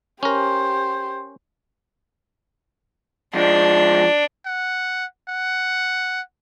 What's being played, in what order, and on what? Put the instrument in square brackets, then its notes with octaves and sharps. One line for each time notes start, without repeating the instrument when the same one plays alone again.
[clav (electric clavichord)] C#4 A#4 [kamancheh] G4 C5
[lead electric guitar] F3 G#3 [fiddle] D4
[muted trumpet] F#5
F#5